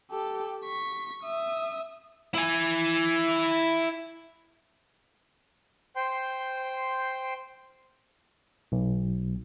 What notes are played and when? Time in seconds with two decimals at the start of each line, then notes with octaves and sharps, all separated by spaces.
0.11 G4 A4
0.65 C#6 B6
1.24 E5 D#6
2.34 E4 G#5
5.96 C5 G5 C6
8.72 B1